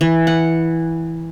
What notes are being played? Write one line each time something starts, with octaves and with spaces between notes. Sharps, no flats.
E3
F#5